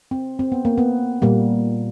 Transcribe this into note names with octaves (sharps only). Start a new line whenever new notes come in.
C4
C4
B3
A#3
B3
A#2 G3 A#3